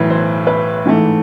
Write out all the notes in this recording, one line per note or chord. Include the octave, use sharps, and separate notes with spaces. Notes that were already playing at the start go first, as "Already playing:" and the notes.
Already playing: B1 A2 E3 B4
C5
B4
G#2 E3 A3